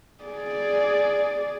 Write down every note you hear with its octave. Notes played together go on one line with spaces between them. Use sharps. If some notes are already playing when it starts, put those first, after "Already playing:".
G#4 D5